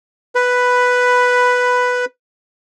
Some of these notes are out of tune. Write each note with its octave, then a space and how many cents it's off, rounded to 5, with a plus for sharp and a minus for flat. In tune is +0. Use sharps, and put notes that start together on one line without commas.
B4 +0 B5 +5